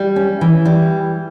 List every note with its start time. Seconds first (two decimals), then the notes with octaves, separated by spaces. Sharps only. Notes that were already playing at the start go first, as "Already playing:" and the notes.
Already playing: G3
0.16 C#4
0.41 E3
0.65 G3